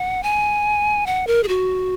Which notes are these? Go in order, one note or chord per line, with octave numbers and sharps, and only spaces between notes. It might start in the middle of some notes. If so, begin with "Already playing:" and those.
Already playing: F#5
G#5
F#5
A#4
G#4
F#4